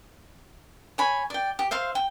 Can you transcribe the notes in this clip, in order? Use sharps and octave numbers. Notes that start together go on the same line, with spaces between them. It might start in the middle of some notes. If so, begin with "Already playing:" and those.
C#5 G#5 B5
D5 G5
G4
C5 E5 F5 C6
G5